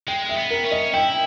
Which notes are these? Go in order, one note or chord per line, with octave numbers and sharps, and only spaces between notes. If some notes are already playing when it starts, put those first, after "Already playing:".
G#3 G5
E5
B3
A#4
C#4
D#5
E4 G5